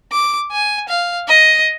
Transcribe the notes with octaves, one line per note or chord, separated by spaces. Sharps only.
D6
G#5
F5
D#5